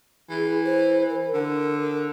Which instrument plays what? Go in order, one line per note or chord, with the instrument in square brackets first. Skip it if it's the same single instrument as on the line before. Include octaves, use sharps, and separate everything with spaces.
[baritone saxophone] E3 [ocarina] G#4
[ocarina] C5
A#4
[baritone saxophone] D3 [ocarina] A#4